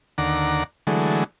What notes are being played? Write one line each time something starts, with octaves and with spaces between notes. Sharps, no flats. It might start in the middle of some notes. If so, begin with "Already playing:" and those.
D#2 D3 F#5 A#5 D6
D3 E3 F#3 G#3 A3